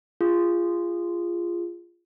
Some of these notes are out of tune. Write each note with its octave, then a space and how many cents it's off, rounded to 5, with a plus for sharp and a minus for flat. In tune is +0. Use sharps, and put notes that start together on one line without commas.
F4 -15 G#4 -20